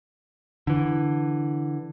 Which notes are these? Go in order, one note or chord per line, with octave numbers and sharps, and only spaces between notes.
D3 E3